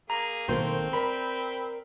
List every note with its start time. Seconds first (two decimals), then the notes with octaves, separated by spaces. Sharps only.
0.10 A#3 G#4 A#5
0.48 B1 D#3 A3 A#3 C4 C5 G5
0.93 A#4 D5 B5